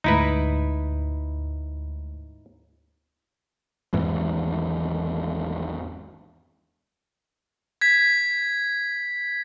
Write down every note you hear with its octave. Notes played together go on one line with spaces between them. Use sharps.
D2 G#2 D#4 E4 B4
G#1 E2 G#2 E3
G#6 B6